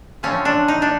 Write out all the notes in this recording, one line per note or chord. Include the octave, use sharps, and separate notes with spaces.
D3 F3 A3 C4 C#4
D4
D#4
D4